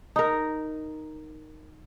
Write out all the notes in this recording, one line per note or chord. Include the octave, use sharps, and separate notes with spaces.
D#4 A#4